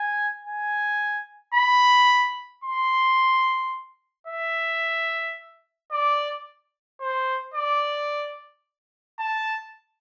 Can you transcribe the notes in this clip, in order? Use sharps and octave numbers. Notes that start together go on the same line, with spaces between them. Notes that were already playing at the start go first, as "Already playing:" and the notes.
Already playing: G#5
G#5
B5
C6
E5
D5
C5
D5
A5